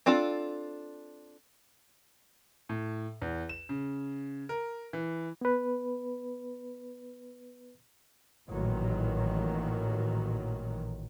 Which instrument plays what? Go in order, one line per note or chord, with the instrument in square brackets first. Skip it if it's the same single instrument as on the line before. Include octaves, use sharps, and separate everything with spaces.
[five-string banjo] C4 D4 F4 A4
[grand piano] A2
E2
E7
C#3
A#4
E3
[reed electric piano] B3 B4
[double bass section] A1 A#2 D#3 F#3